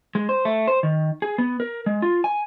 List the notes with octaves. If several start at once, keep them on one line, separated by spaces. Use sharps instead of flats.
G#3
C5
A3
C5
D#3
G#4
B3
A#4
G#3
F4
G#5